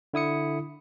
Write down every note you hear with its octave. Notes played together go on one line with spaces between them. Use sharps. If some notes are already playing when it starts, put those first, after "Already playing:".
D3 E4 D#6 C#7